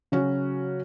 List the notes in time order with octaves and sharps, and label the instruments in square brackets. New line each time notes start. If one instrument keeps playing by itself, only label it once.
[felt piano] C#3 F#3 C#4 F#4